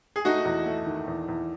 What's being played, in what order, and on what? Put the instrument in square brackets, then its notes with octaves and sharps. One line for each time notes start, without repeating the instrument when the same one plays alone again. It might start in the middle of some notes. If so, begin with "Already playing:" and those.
[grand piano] G#4
[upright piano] A3 [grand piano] D#4 F#4
[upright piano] E2
A3
D#3
E2
E2